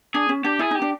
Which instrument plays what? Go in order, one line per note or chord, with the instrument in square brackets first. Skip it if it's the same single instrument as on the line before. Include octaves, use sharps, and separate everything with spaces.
[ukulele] D4 [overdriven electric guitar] G#4
[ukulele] C#4
[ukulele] D4 [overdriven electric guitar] G4
[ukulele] E4 [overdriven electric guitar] G#4
[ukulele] D#4 [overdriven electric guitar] G4
[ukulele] D4